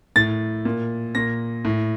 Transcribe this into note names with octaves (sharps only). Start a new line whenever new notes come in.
A2 A6
A#2
A#2 A#6
A2